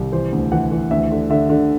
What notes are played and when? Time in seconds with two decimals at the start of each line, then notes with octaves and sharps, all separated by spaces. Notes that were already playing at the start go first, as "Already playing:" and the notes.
Already playing: C2
0.12 E3 C5
0.32 D2
0.52 E3 F#5
0.71 E3
0.91 D2 E5
1.11 D3
1.30 D3 E5
1.49 D3